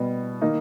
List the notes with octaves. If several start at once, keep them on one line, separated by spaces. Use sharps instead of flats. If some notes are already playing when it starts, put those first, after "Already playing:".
Already playing: B2 G3 B3
D#3 A#3 D#4